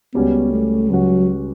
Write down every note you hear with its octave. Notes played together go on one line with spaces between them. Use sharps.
C#2 C#3 G3 B3 C#4 F#4
A3
C#2 C#3 F#3 G3 C#4 F#4